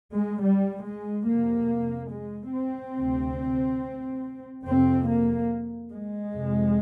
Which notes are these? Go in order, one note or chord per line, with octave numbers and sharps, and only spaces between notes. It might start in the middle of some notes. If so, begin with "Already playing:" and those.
G#3
G3
G#3
F2 C3 A#3
G#3
C4
D2 C3
F2 C3 C4
A#3
G#3
F2 C3